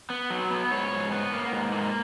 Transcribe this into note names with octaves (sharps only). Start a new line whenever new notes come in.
B3
F#3
B3
G#2 C#5
G#2
B3
A#3
G#2
A#3